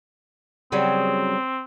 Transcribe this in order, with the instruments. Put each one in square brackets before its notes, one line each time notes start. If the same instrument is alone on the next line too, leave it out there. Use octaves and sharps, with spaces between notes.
[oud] C#3 F#3 G3 [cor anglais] C4